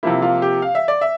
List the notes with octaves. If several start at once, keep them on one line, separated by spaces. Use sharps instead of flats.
C3 F3 A#3 E4
F4
G4
F5
E5
D5
E5